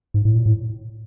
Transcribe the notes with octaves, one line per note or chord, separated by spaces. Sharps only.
G#2
A2
A#2
A2